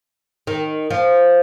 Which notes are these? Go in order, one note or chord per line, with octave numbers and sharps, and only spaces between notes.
D#3
F3